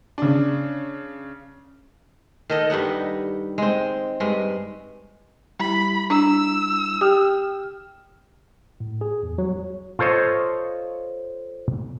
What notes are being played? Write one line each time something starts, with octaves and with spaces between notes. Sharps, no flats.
C#3 D4
D#3 A4 D#5
G2 G3 D#4 F#5
G#3 C4
G2 G#3
G3 E4 B5
D4 E6
G4 G5 F6
A2
G#4
E2
F#3
F4 A4 C5 C#5 D#5